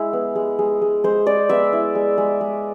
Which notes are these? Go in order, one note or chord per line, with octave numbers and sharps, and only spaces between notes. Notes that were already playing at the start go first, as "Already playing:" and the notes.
Already playing: G#3 E4
B3
G#3
G#3
G#3
G#3 C5
G#3 D5
B3 E5
E4
G#3
G#3
G#3